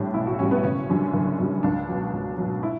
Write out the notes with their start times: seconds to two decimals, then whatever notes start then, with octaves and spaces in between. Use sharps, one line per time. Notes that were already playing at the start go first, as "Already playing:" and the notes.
Already playing: A2 G3 D4
0.14 B1 E4
0.27 F#4
0.39 A2 G3 C#4
0.51 B3
0.64 F#1 C#4
0.89 F#2 D3 G3
1.13 F#1
1.38 F#2 D3 G3
1.63 C#2 D4
1.88 B2 F#3
2.13 C#2
2.38 B2 F#3
2.63 E4